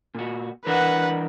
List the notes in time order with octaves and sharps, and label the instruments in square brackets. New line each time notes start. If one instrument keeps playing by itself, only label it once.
[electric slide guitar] A#2 F#4
[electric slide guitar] E3 D4 A#4 [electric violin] B4 F#5